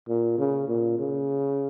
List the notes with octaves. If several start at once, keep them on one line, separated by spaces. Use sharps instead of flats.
A#2
C#3
A#2
C#3